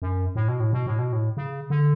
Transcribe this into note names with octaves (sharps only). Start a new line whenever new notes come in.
F#2
A2
B2
A2
B2
A2
B2
A2
C#3
D3